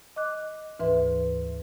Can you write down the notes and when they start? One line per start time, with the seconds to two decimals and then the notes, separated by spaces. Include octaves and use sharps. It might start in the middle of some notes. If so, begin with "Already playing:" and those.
0.16 D#5 D6 F#6
0.79 D2 G#2 E3 B4 E5 C6